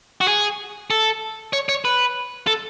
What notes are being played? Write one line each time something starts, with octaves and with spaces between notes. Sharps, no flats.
F#4
G#4
A4
C#5
C#5
B4
A4